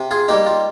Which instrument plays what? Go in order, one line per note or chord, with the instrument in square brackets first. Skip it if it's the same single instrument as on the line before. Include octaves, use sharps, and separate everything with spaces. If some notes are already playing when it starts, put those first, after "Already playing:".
Already playing: [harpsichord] C3
F4 G#4
G3 A#3 D#4 G4
F4